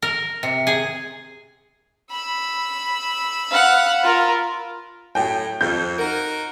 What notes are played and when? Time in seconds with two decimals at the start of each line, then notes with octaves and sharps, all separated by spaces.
0.02 A#4
0.43 C3
0.67 G#4
2.11 B5 E6
3.51 F5 F#5
4.03 F4 A#4
5.15 A2 F#3 G5
5.61 F2 G6
5.99 D#4 F#4 A#4